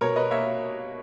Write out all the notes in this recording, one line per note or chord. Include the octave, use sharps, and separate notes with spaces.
B2 A#4 C#5
B4 D#5
A#3 C#5 E5